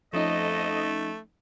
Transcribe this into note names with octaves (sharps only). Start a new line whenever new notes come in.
F2 F3 A3 C#4 D#4 D#5